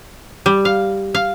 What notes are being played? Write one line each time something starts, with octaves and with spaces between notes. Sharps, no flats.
G3
F5
F5